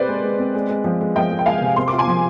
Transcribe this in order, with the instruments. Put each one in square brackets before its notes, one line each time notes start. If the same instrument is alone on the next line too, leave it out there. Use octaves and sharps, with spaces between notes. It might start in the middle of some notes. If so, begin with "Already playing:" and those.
Already playing: [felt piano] C4 G4 [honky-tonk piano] B4 C5 D5
[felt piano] G#3
G#3
C4
G#3
G#3
F3
G#3
[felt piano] F3 [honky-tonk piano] D#5 G5
[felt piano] G#3
[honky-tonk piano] G5
[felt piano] G#3 [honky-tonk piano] F5 G#5
[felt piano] C3
[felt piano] C4 [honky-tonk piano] C6
[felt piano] F4 [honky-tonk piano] D6
[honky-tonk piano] G#5 C6
[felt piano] F3